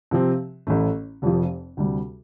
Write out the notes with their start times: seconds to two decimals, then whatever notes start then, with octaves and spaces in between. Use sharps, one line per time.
0.11 C3 F3 C4
0.67 A1 A2 A3
1.22 F1 F2 C3 F3
1.77 D2 C3 G3